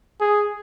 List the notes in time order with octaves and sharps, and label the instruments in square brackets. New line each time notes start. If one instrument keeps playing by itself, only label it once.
[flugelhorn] G#4